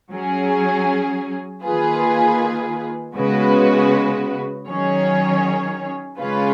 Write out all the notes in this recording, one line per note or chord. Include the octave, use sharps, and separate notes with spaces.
F#3 C#4 G#4
D#3 A#3 F4 G#4 B4
C#3 G#3 B3 F#4 B4
D#3 F#3 C#4 G#4 C#5
C#3 G#3 C#4 F4 B4